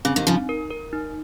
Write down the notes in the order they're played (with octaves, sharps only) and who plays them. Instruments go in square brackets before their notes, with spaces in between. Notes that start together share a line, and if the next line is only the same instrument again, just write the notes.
[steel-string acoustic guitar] C#3 [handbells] C4
[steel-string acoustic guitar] C3 D#3
[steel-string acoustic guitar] C#3 F3 [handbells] D#4
[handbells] A#4
A#4
D#4